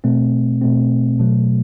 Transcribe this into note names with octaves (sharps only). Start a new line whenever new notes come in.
B2 A3 C4
B2 A3 C4
B2 F#3 A3